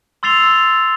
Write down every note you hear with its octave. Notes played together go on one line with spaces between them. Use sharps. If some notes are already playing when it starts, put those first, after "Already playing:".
C6 E6 A6 C7 F7 G7